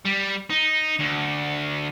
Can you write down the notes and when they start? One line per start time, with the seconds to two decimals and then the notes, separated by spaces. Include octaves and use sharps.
0.05 G3
0.50 D#4
1.00 D2